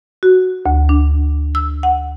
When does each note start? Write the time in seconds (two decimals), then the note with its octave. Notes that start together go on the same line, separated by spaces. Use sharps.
0.23 F#4
0.66 D2
0.89 D4
1.55 E6
1.83 F#5